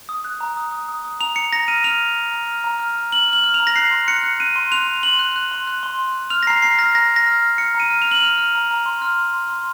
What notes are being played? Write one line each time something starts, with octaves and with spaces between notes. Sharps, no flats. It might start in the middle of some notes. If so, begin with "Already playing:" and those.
D#6
F#6
A#5
D#6
D#6
D#6
D#6
A#5 F7
A#5 C#7
A#5 A#6
F6 D#7
F6 F7
F6
A#5
A#5
F6
A#5
F6
A#5
F6 F#7
F6 F#7
F6
F7
A#5
A#6
F#6 C7
C6
F#6 C#7
F#6
F#6 D#7
C6
F#6 F7
C6
C6 F#7
F#6
F#6
C6
F#6
C6
C6
F#6
F6 F7
A#6
A#5 C7
A#5 C7
F6 A#6
A#5 A#6
A#5 A#6
F6
F6
F6 C#7
A#5
D#7
F6
F7
F6 F#7
F6 F7
F6
A#5
A#5
C6
F6
C6
C6
C6